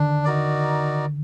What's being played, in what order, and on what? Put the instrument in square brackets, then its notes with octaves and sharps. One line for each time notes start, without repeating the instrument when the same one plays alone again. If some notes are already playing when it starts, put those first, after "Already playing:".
Already playing: [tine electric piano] D3 D#3 [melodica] D4
[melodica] D#4 F#4 A#4 D5